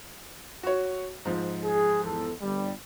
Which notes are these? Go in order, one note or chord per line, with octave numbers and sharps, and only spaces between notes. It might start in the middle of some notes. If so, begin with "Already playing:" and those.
F#4 C#5
G#2 F3
G#4
E2 A4
G1 G3